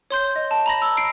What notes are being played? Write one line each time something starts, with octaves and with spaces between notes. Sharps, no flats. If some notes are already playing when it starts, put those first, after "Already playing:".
C#5 C6 G6
D#5
A5
A#5 B5 A#6
E6
C7 D7